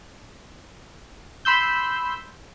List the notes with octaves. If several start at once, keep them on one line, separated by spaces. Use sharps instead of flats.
B5 C6 E6 G6